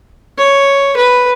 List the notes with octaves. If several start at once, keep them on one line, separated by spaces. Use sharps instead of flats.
C#5
B4